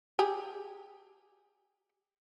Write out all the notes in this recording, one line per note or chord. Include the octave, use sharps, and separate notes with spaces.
G4 G#4